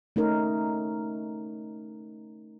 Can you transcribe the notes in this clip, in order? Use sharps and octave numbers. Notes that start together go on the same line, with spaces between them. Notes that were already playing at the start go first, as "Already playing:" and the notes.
A3 C#4 D#4 A#4